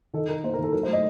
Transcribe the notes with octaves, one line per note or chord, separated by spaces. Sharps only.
D#3 A4
D#3 A#4
A#3 C5
A#4
D#3
A4
F#3 A#4
C5
A3
D#5